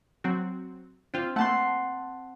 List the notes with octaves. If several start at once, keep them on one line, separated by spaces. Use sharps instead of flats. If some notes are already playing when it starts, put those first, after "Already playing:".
F#3 C4 F#4
C4 D4 F4
A3 A#3 F#5 A5 C6